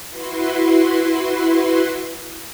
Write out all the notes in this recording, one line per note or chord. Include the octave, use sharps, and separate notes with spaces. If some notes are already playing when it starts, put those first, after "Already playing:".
E4 F#4 B4 C6